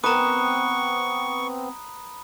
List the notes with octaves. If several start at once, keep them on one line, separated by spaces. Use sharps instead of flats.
B3 C4 B4 A#5 C#6 D#6